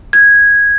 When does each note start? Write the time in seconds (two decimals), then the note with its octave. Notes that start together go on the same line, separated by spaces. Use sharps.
0.13 G#6